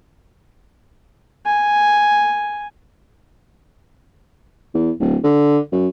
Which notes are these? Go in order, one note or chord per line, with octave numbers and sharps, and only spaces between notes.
G#5
E2
D1
D3
F#2